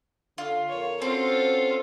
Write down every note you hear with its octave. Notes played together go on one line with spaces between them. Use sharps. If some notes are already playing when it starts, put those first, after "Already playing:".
D3 F4
F2 A4 A#4 C#5
C4 C#4 F4 F#4 A4 C5